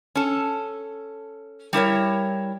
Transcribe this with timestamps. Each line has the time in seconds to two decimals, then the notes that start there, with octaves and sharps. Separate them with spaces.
0.15 C#4 A4
1.73 G3 E4 A#4 C#5